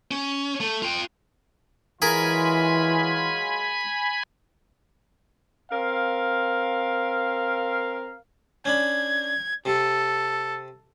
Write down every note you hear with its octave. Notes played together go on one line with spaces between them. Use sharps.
C#4
A3
F4 G5
E3 F#3 G#3 F4 G#4 A#4 G#5 B5
C4 A#4 F5
C#4 D4 B5 G#6
C3 A4